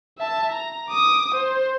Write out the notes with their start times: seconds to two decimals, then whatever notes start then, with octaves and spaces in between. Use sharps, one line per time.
0.18 E5 A5
0.52 A#5
0.89 D6 D#6
1.35 C5